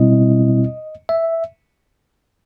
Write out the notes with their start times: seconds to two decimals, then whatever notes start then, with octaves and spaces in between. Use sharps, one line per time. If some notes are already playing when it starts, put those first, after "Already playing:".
Already playing: B2 G3 C4 E4 D#5
1.09 E5